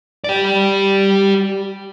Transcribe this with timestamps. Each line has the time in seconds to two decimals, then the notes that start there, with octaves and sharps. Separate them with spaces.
0.24 G4 D5